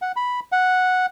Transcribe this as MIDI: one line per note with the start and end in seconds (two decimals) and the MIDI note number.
0.02 0.12 78
0.16 0.40 83
0.52 1.06 78